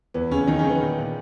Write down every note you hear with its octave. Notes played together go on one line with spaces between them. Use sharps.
E2 B3
E2 C#3 C#4
E2 D#3 D#4
C#3 C#4
D#3
B3
A#2
A#2